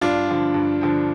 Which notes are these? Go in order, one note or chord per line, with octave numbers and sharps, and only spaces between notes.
G2 D4 F4
D3 F3
G2
D3 F3